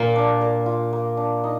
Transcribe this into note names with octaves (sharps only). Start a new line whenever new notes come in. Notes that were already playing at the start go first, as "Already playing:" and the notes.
Already playing: A#2 A#3
D4
A#4
F4
A#3
D4
D#4